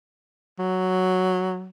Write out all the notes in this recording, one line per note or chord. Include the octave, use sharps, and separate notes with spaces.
F#3